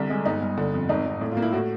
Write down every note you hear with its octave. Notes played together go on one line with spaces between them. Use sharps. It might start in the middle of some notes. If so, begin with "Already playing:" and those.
Already playing: C2 D3
G#3
G1 D#4
G1
D3
F2
G#1 D#4
G#1
A2
F4
A#3
E4
A2 F#4